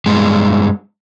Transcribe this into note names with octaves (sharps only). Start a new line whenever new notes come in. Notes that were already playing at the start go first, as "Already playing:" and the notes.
G2 G#3 B3